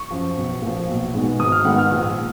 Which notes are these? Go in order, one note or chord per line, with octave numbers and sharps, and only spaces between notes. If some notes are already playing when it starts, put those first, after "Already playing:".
Already playing: C#6
F#2 F3
B1
A#2 F3
B1
B2 G#3 D#4
G#1 D#6
F6
G#2 D#3 G#3 B3 F#5
F6
A#1